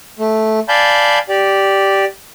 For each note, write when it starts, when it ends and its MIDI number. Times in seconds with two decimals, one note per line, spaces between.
0.19 0.60 57
0.69 1.19 74
0.69 1.19 77
0.69 1.19 80
0.69 1.19 81
0.69 1.19 83
0.69 1.19 91
1.29 2.05 67
1.29 2.05 74